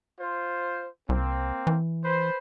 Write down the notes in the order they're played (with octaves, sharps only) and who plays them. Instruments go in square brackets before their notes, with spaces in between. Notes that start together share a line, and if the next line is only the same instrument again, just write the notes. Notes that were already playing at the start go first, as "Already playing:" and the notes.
[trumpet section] F4 C5
[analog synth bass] C2 [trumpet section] A#3 C4
[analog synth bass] E3
[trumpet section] B4 C5